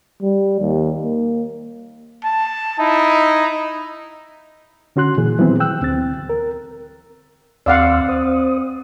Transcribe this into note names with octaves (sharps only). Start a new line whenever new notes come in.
G3
D#2
A#3
A5
D#4 E4
D3 C#4 F#4 C6 F#6
A#2 E3 G#4
D#3 E3 F#3 G3 B3 C4
G5 E6 F#6
D2 C4 A6
A#4
D#2 C4 D5 F5 F#5 C6 E6
C5 D#6